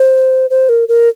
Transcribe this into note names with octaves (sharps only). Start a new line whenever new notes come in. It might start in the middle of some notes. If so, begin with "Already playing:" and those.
Already playing: C5
C5
A#4
A#4